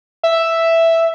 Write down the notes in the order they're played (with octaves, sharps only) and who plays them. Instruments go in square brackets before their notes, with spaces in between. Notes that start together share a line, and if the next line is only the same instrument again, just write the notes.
[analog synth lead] E5